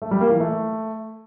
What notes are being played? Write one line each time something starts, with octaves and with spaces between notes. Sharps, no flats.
A3
G3
A#3
E3
A3